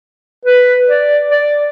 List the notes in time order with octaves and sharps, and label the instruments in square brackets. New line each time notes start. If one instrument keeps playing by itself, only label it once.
[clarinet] B4
D5
D5